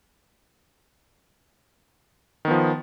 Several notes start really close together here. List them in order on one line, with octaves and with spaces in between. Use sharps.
D#3 B3 F3